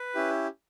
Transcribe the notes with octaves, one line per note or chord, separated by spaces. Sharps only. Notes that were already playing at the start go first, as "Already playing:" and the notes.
Already playing: B4
C#4 E4 G4